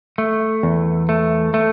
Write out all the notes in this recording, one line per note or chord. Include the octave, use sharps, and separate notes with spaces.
A3
E2
A3
A3